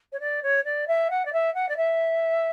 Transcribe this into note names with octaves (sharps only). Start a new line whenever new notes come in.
C#5
D5
C#5
D5
E5
F#5
D5
E5
F#5
D5
E5